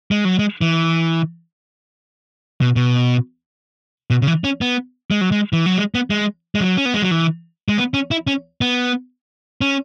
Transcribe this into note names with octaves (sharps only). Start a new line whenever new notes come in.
G#3
F#3
G#3
E3
B2
B2
B2
C#3
E3
C#4
B3
G#3
F#3
G#3
E3
F#3
G#3
B3
G#3
G#3
F#3
C#4
B3
G#3
F#3
E3
G#3
B3
C#4
E4
C#4
B3
C#4